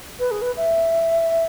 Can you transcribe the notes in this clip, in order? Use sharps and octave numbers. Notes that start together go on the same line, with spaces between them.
B4
G#4
B4
E5